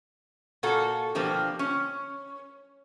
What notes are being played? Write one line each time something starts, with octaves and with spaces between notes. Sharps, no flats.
A#2 F4 F#4 A4
B2 F3 A#3 C4 D4 G4
C#4